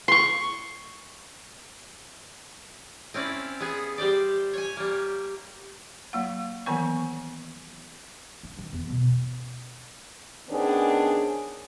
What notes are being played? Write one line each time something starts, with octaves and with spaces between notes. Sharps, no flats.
C6 C#6
C4 C#4 E4 D5
B3 G#4
G3 G4 C5 D5
C#5 G#5
G3 A#3
F#3 A#3 F#5
D#3 E3 F#3 B3 G#5 C#6
D4
D#3
E2
B2
D#3
D#3 B3 C#4 D4 G#4 C5